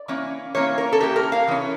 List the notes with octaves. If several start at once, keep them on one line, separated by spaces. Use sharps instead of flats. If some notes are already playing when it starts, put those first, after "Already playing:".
Already playing: D5
E3 A#3 C#4
E3 A#3 C#4 C#5
A#4
A4
E3 A#3 C#4 G4
A#4
F5
C#3 E3 C#4